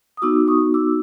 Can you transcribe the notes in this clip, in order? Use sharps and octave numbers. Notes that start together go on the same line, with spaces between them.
D#6
B3 D#4 F#4 D6 E6
C#6 D#6
D6 E6